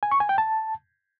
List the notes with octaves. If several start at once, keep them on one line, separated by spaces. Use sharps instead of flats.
G#5
C#6
G#5
G5
A5